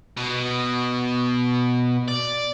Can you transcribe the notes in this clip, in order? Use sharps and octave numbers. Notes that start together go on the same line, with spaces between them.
B2
D5